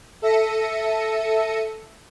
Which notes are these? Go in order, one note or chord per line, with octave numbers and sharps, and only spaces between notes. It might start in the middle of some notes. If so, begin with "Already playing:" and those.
A4 E5 A#6 C#7 D#7